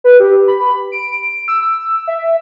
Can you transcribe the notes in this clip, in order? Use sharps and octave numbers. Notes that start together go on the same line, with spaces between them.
B4
G4
B5
D7
E6
E6
E5